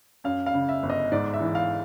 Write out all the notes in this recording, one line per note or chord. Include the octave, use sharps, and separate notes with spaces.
F#2 F5
F5
C#3
E5
G1
D#5
G#2 D5
E5
E3
F5